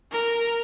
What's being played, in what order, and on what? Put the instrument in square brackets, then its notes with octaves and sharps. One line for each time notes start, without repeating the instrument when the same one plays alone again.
[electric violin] A#4